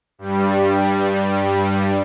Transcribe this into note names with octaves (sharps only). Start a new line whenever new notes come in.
G2 G3